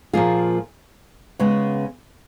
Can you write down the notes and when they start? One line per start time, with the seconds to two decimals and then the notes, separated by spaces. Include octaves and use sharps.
0.13 A#2 F3 A#3 F4 G#4
1.39 C#3 G#3 B3